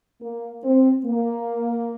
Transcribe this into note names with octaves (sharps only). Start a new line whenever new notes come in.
A#3
C4
A#3